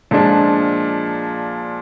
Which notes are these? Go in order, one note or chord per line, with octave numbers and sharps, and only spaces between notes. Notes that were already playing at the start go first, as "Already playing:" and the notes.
A#2 F3 G#3 D4